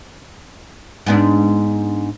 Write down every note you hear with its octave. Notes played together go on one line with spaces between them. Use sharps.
G#2 B3 D4